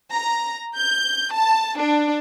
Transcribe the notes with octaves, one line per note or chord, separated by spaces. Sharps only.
A#5
G6
A5
D4